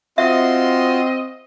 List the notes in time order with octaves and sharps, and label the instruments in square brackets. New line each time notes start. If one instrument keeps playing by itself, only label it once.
[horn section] C4 D#5 [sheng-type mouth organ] F4 F#4 C6 [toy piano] E5